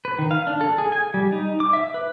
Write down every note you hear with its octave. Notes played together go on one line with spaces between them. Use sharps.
B4
D#3
F5
D4
A4
G#4
G#5
G3
D#4
D6
E5
B4